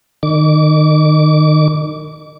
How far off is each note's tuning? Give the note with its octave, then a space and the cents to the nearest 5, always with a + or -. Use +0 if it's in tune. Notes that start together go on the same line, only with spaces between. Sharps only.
D#3 -25 D6 -30